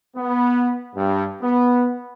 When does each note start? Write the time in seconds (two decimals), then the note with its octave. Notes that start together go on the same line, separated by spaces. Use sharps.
0.16 B3
0.96 G2
1.42 B3